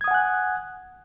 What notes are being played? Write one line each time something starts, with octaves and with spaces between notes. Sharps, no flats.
F#5 G#5 D#6 F#6 G#6